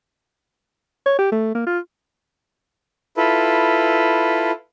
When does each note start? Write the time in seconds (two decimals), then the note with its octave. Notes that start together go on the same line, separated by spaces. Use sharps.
1.06 C#5
1.19 G4
1.32 A3
1.55 A#3
1.67 F4
3.17 E4 F4 A4 B4